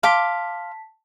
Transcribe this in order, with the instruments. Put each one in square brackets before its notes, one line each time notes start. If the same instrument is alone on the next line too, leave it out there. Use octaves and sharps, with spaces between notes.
[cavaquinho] F5 C6 D6 [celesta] A5 B6